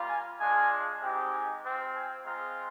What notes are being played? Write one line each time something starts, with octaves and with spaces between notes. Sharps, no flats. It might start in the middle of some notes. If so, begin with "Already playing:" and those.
Already playing: G3 A#3 F4
G#5
G#3 D4 F4 G#5
G#3 C4 D#4 G4
G#5
C4 F4
G#5
G#3 C4 F4 A#5